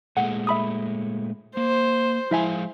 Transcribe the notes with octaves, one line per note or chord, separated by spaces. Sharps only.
A#2 G#3 A3 F#5
E5 B5 D#6
A#3 C5
F3 G#3 E4 E5 F5 G#5